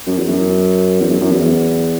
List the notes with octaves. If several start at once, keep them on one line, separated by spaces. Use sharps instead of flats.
F#2
E2
F#2
E2
F#2
F#2
E2